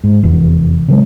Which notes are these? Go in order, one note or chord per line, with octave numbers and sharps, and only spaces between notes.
G#2
F1 E2
C#3 F#3 G#3